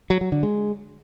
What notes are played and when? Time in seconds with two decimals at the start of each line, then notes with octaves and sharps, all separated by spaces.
0.10 F#3
0.21 F#3
0.32 D3
0.43 G#3